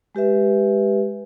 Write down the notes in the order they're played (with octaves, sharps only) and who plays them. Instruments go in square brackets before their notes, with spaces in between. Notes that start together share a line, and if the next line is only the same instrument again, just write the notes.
[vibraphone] G#3 G4 B4 E5